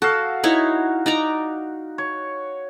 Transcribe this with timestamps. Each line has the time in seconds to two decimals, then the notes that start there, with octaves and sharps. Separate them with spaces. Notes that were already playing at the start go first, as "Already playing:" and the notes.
0.02 F#4 A4 F5
0.44 D#4 E4 C#5
1.06 D#4 D5 A#5
1.98 C#5